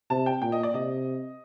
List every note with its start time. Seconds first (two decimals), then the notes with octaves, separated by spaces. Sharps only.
0.10 C3 A5
0.26 G5
0.42 A#2 G5
0.52 D#5
0.63 D5
0.74 C3 D#5